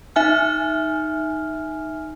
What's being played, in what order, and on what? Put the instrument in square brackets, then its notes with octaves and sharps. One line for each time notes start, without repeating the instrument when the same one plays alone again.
[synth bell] D#4 E5 G#5 F6